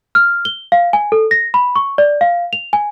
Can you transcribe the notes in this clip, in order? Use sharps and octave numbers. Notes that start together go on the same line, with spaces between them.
F6
G7
F5
G#5
A4
A#6
B5
C#6
D5
F5
F7
G#5